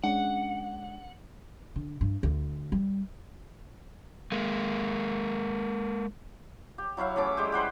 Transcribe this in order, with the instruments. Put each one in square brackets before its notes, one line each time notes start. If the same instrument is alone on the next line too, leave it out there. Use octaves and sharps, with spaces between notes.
[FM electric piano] G#3 C#4 D4 [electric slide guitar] F#5
[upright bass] D3
G2
D2
G3
[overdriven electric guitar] G#3 A#3
[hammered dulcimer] G4
F#3 E4 C#5 F5
E3 A3 C#4 D6
G3 G#3 G4
B4 C5 F#5 G5